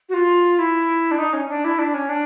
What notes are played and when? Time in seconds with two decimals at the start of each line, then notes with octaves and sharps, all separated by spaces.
0.09 F#4
0.13 F4
0.58 E4
1.11 D4
1.18 D#4
1.33 C#4
1.49 D4
1.64 E4
1.78 D4
1.94 C#4
2.09 D4